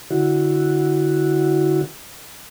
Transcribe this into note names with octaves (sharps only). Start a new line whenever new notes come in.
D3 E4 F#4